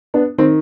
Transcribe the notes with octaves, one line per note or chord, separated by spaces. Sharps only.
B3 D4
D#3 C4